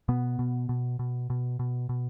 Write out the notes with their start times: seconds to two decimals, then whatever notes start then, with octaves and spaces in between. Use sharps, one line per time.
0.08 B2 B3
0.39 B2
0.69 B2
0.99 B2
1.30 B2
1.59 B2
1.89 B2